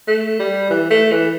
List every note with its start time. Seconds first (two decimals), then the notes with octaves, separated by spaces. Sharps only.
0.08 A3
0.39 G3
0.70 E3
0.90 A3
1.12 E3